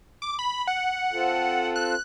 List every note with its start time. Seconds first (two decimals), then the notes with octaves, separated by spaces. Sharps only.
0.22 D6
0.39 B5
0.67 F#5
1.13 C4 F4 A4
1.76 F#6